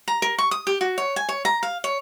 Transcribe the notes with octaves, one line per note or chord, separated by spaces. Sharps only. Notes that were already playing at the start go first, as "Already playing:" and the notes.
A#5
A#4
C#6
D#6
G4
F#4
C#5
G#5
C#5
A#5
F5
C#5